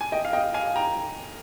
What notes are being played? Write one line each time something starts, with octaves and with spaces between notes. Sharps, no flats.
G#5
D#5 G5
F5
D#5 G5
F5 G#5
G5 A#5